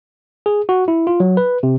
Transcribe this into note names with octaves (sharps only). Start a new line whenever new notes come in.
G#4
F#4
E4
F4
F#3
B4
C3